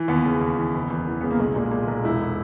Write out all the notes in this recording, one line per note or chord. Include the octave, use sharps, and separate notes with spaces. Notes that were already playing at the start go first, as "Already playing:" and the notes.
Already playing: E3
D#2 B3
C#3
D#2
E3
F#1
E2
E3
C#3 B3
A#3
B1 G#3
A#2
G#3
A#2
B1 G#3
E1 E4